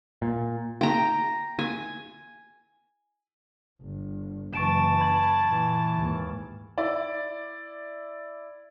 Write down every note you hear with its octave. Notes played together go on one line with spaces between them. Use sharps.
A#2
G5 A#5
G#5
G1
F#1 F#2 E3 A5 C#6 D7 E7
B5 G#6 F#7
A#2 E3
D#2 G#2
E4 D5